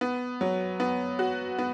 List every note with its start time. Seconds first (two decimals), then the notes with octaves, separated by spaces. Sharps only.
0.01 B3
0.41 F#3
0.80 B3
1.19 F#4
1.58 B3